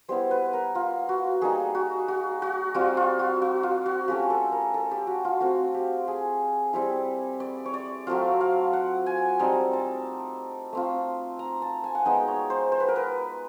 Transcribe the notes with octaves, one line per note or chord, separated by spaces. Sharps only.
G3 B3 E4 C5
B4
A#4
F4
F#4
G3 A#3 D#4 G#4
F#4
F#4
F#4
G3 C4 F4 F#4
F4
F#4
F#4
F4
F#4
A3 C#4 F4 G4
A4
A#4
A4
G4
F#4
F4
A3 C4 F4 F#4
G4
G#4
G3 C4 E4
D5
C#5
D5
F#3 A3 C4 F4 F5
F5
F#5
G#5
G3 C4 D#4 A5
A5
A3 C4 F4
A#5
A5
G#5
F#5
G#3 B3 D#4 G5
C#5
C5
C5
B4
A#4
B4